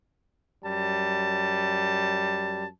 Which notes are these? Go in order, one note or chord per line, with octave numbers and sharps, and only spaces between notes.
F#2 G3 A5